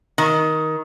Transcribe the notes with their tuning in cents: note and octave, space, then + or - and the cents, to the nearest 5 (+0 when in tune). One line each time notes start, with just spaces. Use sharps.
D#3 +15